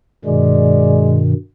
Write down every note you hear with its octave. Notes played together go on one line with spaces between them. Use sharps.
G2 B2 D#3 G#3 D5